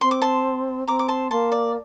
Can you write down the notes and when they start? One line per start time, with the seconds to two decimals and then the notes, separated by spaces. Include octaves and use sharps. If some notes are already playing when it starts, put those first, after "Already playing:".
0.01 C4 C6
0.11 D6
0.22 A5 C6
0.87 C4 A#5 D6
0.99 D6
1.08 A5 C6
1.31 A#3 A5 C6
1.52 D5